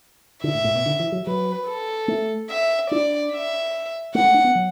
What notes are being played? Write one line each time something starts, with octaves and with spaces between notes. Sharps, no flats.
D3 E5
A2
A2
B2
D3
E3
F#3
F#3 B4
A4
A3
E5
D4 D5
E5
A3 F#5
A3
D4
B3
F#3